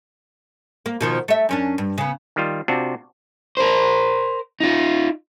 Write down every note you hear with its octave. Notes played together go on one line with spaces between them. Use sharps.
A#3
B2 D#3 F3
A3 E5
F#2 C#4 D4
G2
C#3 B3
D#3 G3 F4
C3 C4 D4 F4 F#4
A#4 C5
D#4 F4